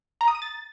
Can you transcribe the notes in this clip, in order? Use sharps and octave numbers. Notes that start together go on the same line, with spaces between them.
A#5
D#6
D#7
A6